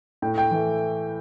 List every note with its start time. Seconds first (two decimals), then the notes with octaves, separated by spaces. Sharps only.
0.22 A2 G5
0.38 G5
0.51 E3 A3